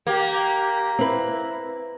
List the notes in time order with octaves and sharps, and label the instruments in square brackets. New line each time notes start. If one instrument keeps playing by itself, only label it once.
[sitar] A#3 [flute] G4
[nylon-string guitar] C4 B4 [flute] E4